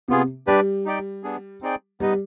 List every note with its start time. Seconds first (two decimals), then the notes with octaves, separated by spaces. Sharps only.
0.08 C3 B3 F4 G#4
0.47 G3 D4 G4 B4 D5
0.86 D#4 G4 D5 G5
1.23 B3 D4 G#4
1.62 C4 D#4 G#4 D5 G5
2.00 G3 B3 D#4 B4 D#5